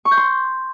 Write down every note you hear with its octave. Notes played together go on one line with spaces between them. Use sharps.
C#6
G6
C6